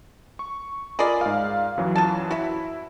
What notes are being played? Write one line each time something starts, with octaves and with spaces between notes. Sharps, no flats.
C#6
F4 G#4 A#4 D5 D#5 B5
G#2 F5
F#2 E3 F#3
F4 A5
E4 F#4 E5